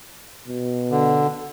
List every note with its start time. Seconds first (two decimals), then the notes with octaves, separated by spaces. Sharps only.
0.48 B2
0.91 D3